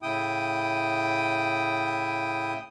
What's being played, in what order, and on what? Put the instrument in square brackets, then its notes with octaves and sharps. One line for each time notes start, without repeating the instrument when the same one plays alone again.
[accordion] A2 C#3 E4 G5 D#6